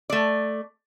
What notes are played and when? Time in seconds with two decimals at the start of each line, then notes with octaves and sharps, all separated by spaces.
0.10 A3 D5